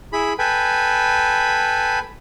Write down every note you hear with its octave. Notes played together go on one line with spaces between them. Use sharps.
E4 G#4 B5
A4 B4 G5 G#5 B5